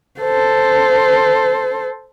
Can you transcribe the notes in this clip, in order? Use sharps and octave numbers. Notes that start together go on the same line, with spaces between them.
A4 C5